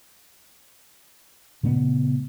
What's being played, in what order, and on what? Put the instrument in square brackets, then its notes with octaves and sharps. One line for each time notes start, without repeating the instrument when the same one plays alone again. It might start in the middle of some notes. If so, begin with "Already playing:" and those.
[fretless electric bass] A#2 C#3 A3 B3